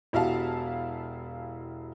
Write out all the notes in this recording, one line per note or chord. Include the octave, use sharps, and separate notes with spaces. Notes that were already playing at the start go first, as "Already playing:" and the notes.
E1 E4 F#4 G4 F5 A5